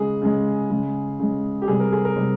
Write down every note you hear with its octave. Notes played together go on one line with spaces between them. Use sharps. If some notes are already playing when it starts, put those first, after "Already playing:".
Already playing: C#3 G#3 G#4
C#3 G#3
C#3 G#3
C#3 G#3
G4
C3 G3 G#4
A#4
G#4
A#4
C3 G3